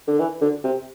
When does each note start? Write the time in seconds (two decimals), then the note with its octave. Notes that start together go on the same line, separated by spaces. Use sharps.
0.08 D3
0.19 E3
0.41 D3
0.64 C3